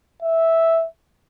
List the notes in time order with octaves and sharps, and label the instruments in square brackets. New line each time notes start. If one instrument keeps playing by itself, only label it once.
[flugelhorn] E5